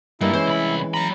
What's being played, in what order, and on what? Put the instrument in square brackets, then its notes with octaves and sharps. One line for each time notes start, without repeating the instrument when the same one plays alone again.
[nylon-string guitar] G2 G3 A#3 [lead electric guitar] G#3 D#4 [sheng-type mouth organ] E4
[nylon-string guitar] E3 G#3 C#4 [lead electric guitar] C5
[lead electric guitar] C2 B5
[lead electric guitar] F#3 B5 [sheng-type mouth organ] A#5